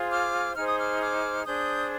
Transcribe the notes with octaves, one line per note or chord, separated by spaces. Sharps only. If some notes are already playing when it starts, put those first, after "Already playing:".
Already playing: F4 G#4 C5
D6 F6
D#4 G#4 C5 F6
D#6
D6 F6
D6 F6
D4 G#4 C5 D#6 G6